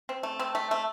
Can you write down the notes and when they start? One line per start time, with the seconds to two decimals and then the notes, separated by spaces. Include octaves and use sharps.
0.09 C4
0.23 A3
0.39 C4
0.55 A3
0.71 A3